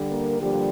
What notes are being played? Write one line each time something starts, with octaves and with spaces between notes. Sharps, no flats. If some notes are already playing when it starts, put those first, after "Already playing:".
Already playing: D3 G3
A#3 A#4
D3 F3 G3 A#3 G4